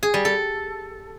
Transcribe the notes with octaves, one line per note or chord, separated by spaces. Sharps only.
G#4
G3
A4